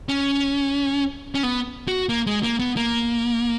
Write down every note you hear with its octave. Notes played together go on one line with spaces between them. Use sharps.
C#4
C#4
B3
F#4
A#3
G#3
A#3
B3
A#3